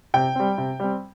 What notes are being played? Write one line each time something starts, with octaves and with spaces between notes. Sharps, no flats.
C3 G5
G3 C4
C3
G3 C4